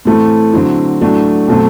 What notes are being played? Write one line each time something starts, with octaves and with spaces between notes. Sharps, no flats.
A2 E3 A3 C4
D3 F#3 C4 E4
A2 F#3 A3 D4
B2 F#3 A3 C4